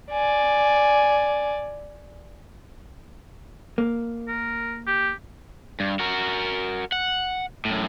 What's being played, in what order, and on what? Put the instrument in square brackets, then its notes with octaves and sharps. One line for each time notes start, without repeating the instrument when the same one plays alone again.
[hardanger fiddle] D5 G#5
[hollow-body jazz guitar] A#3
[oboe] A#4
G4
[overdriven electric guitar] G2
F#4 A#4
F#5
F#2 A2